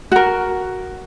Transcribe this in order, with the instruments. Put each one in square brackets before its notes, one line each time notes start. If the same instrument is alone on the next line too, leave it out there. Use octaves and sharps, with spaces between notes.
[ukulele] F#4 A#4